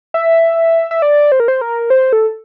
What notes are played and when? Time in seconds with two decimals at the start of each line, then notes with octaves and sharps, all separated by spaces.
0.14 E5
0.91 E5
1.02 D5
1.32 C5
1.40 A#4
1.48 C5
1.61 A#4
1.90 C5
2.13 A4